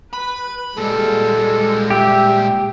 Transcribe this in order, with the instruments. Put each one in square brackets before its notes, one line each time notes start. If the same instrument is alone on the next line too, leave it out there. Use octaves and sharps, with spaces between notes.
[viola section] B4 [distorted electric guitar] B5
[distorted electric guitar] A#2 G3 [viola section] G#3 [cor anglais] A4
[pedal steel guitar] G4 [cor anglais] E5